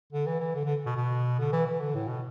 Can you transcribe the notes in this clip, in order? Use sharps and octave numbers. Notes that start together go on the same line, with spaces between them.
D3
E3
E3
D3
D3
B2
B2
D3
E3
E3
D3
A2
B2